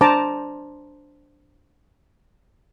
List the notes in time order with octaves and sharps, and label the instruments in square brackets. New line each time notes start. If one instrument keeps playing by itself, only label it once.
[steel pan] D4 C5 A5 A#5 D6